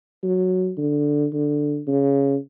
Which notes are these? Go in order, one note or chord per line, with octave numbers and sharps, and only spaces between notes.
F#3
D3
D3
C#3